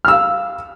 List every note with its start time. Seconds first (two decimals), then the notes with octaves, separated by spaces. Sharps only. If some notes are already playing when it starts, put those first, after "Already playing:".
0.05 F6
0.08 E6
0.12 F5